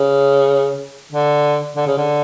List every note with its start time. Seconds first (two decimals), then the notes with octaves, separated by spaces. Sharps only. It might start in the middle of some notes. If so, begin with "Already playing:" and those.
Already playing: C#3
1.12 D3
1.76 D3
1.87 C#3
1.97 D3